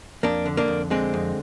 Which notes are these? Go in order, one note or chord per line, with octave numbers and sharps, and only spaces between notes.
F2 A#3 D4
D3
A#3 D4
F2
D3 G#3 C4
F2